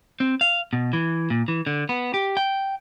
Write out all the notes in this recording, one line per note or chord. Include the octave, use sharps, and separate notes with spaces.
C4
F5
B2
E3
A#2
E3
D3
B3
G4
G5